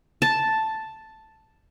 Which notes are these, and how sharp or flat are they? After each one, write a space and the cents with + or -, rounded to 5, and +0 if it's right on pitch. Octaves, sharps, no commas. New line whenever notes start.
A5 +0